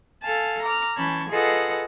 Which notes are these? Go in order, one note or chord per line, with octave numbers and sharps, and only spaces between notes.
A4 F5 G#5 A5
A#5 D6 F6
E3 C#4 A5 B5 G6 G#6
F4 G#4 A4 B4 D#5 F#5